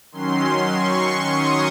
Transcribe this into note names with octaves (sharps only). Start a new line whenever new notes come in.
D#3 F#3 C#4 C6
C#6
D#6